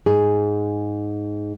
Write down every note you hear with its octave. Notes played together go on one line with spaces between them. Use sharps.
G#2 G#4